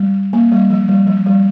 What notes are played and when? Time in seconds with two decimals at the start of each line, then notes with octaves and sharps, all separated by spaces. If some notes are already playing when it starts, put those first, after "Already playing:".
Already playing: G3
0.33 A#3
0.52 G3
0.70 F3
0.89 G3
1.07 F3
1.26 G3